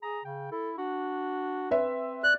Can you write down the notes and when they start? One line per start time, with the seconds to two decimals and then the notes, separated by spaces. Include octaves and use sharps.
0.03 G#4 A#5
0.25 C#3 G5
0.52 E4 A4
0.78 D4 F#4
1.71 C4 B4 E5
2.24 D5 F#6